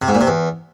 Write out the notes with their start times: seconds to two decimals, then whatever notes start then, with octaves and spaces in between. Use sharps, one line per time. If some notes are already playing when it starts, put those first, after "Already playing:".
0.02 C3
0.08 G#2
0.14 A#2
0.21 C3
0.27 E2